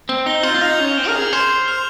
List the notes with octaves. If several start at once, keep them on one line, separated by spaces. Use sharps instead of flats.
C4
D#4 G7
F4 G6 G7
F4
D#4 F6 F7
C#4
G6 G7
C4
A#4 F6 F7
G#4
C5 F6 F7
F6 F7